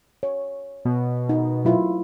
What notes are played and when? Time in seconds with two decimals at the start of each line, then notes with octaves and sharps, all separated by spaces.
0.23 C#5
0.85 B2
1.29 D#4
1.65 F#3 E4 F4